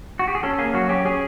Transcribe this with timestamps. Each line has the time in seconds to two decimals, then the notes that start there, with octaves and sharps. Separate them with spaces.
0.19 F#4
0.28 G4
0.35 G#4
0.43 C#4 A4
0.58 A#3 G#4
0.74 F#3 F#4
0.89 C#4 G4
1.05 C#4 G#4